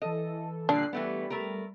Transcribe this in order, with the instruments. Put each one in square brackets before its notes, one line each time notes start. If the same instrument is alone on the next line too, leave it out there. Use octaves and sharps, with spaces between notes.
[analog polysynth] E3 A4 [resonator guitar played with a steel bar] D#5
[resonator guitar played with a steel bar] A#2 D3 G3 [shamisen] D4 [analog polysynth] F#6 C7
[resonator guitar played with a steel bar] E3 A3 B3 [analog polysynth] G3
[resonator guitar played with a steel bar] A3 A#4